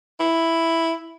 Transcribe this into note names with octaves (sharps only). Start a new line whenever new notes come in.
E4